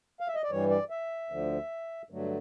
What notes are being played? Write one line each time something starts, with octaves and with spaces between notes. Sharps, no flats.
F5
E5
D#5
D5
G2 E3 G3 C#5
D5
E5
D2 D3 F3
G2 D3 F#3 A3